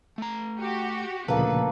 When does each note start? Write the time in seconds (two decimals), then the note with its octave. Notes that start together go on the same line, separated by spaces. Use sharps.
0.18 A3 A#5
0.59 F#4 G4
1.28 D2 A#2 C#3 F3 A#3 A4 B4